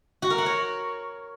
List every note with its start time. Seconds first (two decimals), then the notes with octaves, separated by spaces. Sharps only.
0.22 F#4
0.30 A#4
0.38 F#5
0.46 C#5